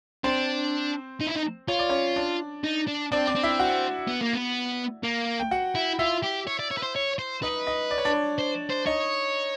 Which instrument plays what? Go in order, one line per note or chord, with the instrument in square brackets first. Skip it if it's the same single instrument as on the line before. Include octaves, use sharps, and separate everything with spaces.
[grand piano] C4 C5 [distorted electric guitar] D4
[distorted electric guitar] D#4
E4
D#4
[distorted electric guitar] F4 [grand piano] C#5
[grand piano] D5
C#4 C#5
D4 D5
[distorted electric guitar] D#4
D4
[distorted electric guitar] C4 [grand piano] D4 D5
[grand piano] D4 D5
[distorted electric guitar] C4
[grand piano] E4 E5
F#4 F#5
[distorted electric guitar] B3
A#3
B3
A#3
[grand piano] G5
F#4 F#5
[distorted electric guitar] E4
[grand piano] E4 E5 [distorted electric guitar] F4
[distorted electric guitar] G4
C#5
D5
C#5
B4
C5
C#5
C5
[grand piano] D#4 D#5 [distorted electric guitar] B4
[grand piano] D#4 D#5
D5
C#5
D4 D5
[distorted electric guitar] C5
C5
[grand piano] D#4 D#5 [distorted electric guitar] C#5